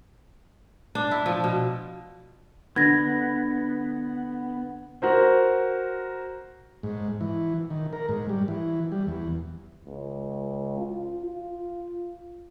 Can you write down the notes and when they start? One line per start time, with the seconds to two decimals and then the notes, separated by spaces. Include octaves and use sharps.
0.95 D4
1.11 E4
1.26 F3
1.44 B2
2.76 D3 B3 G#6 A#6
5.02 F#4 A#4 C5
6.83 G#2
7.21 E3
7.70 D#3
7.93 A#4
8.09 G#2
8.29 G3
8.48 E3
8.92 G3
9.07 E2
9.86 C#2
10.78 F4
11.26 F4